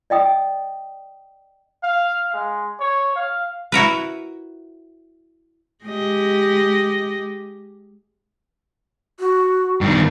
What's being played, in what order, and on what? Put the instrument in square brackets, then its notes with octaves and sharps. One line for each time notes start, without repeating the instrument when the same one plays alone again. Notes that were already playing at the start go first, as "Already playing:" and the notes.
[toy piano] D5 D#5 G5 D#6
[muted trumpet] F5
G#3
C#5
F5
[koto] E4 F#4 A#4 B4
[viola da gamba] G#3 G4 D#5
[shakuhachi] F#4
[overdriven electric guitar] G2 D#3